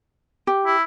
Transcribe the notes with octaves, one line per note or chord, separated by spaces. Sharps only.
G4
E4